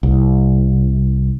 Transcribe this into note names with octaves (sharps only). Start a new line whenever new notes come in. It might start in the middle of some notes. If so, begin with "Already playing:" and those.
C2